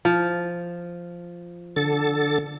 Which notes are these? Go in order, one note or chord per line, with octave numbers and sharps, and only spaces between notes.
F3
D3 A4 A6